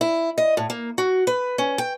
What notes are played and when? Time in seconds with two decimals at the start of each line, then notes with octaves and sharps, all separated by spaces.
0.01 E4
0.38 D#5
0.57 A2
0.70 A#3
0.98 F#4
1.27 B4
1.58 C#4
1.78 G5